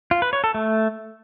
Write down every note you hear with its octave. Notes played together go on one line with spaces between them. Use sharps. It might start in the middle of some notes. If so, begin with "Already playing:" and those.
F4
B4
C#5
A4
A3